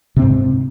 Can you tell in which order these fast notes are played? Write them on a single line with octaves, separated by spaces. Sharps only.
C3 C4 G#2